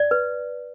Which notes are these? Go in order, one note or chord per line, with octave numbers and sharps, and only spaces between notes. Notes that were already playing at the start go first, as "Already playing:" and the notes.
Already playing: D5
B4